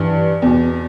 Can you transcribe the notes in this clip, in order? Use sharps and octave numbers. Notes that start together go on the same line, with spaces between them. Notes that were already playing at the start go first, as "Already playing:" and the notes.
Already playing: G2 E3
E2 B2